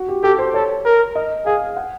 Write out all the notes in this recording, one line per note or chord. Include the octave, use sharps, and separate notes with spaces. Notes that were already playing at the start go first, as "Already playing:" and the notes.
Already playing: F#4
G4
G4 A4
C5
A4 C#5
A#4
D#5
G#4 F5
F#5